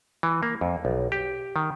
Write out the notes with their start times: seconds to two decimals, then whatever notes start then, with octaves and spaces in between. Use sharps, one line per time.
0.23 E3
0.43 A#3
0.61 F2
0.85 B1
1.12 G4
1.56 D#3